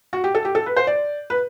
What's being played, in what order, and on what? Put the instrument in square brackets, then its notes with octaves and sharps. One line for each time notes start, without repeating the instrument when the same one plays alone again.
[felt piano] F#4
G4
A4
G4
A4
B4
C5
D5
B4